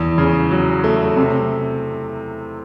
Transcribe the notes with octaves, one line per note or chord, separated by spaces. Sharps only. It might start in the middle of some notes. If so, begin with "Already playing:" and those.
Already playing: E2
C#3
F#3
A3
C3